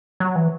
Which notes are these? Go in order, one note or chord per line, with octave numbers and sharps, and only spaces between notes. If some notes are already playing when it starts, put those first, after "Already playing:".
F#3
E3